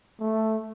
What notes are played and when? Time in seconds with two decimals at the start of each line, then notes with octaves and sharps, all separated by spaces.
0.20 A3